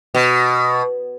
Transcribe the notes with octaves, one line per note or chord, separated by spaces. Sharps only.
B2